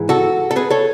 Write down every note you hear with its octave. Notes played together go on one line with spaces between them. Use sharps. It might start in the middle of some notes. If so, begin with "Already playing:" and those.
Already playing: G#2 E3
F#4 A4
A4
G#4 B4
A4 C#5